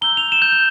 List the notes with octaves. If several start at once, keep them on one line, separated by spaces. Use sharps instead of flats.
A#5 E6 G6 G7
F7
E7
G6
G6